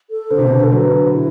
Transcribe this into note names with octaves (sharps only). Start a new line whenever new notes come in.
A4
D3 C5
C3
B2 D3
A4
D3 F#3 B4
E4